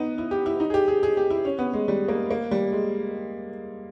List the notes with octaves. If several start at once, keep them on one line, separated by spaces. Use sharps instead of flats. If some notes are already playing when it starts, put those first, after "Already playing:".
Already playing: B3 D#4
E4
G4
E4
D#4
G#4
G4
G#4
G#4
G4
E4
C#4
B3
G#3
G3
A#3
A#3
G3
G#3